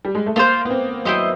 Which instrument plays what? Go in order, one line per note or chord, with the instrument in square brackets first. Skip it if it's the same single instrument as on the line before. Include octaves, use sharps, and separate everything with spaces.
[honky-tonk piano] G3
G#3
A3
[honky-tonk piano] A#3 [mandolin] F4 A4 C5 F5
[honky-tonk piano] B3
C4
[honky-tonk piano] F#3 [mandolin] E4 G4 C5 D#5